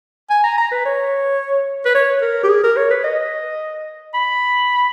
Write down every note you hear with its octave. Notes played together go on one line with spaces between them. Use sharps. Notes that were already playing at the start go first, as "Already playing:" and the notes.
G#5
A#5
A#5
B4
C#5
B4
C#5
A#4
G4
G#4
A#4
C#5
B4
D#5
B5